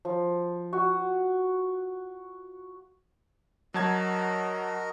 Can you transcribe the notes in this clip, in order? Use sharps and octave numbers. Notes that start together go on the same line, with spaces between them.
F3
F#4
F#3 F#4 A#4 D#5 A5 G#6